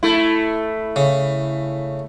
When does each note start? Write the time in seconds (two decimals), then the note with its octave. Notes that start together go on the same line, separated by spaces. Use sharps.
0.03 A3 E4
0.96 C#3